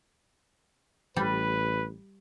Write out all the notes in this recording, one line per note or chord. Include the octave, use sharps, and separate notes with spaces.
A1 G3 B4